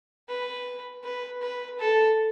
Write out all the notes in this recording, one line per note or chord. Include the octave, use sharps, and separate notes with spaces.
B4
B4
B4
A4